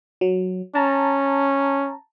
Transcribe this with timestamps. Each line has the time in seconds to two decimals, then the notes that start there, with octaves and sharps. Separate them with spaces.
0.21 F#3
0.75 C#4 A5 A#5